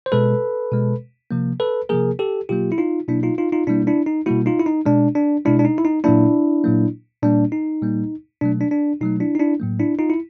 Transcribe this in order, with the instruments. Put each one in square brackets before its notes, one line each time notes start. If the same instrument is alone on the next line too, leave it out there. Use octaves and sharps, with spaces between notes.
[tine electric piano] C5
B2 G#3 A4 B4
B2 G#3
C3 F3 A#3
A4 B4
C3 F3 A#3 G#4 A#4
G4 A4
B2 F#3 A#3 F4 G4
E4
D#4 F4
B2 F#3 A#3 D4 E4
D#4 F4
D#4 F4
D#4 F4
B2 G3 A#3 D4 E4
D4 E4
D#4
B2 G3 A#3 E4 F#4
D#4 F4
E4
D#4
B2 G#3 D4
D4
B2 G#3 D4 E4
D4
D#4
E4
D#4
A#2 F#3 A#3 D4 E4
A#2 F#3 A#3
A#2 G3 A#3 D4
D#4
A#2 G3 A#3
B2 F#3 A3 D4
D4
D4
B2 F#3 A3 D#4
D4 E4
D#4
D4 E4
A2 F#3 A#3
D4 E4
D#4 F4
E4